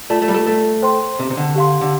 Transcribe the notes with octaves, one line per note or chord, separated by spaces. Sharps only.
A3 F4 D5 A5
A3
G3
A3
A3
C5 G5 C6
C3
C3
D3
G4 F5 C6
D3